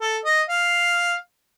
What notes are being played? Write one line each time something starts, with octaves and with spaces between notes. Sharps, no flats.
A4
D#5
F5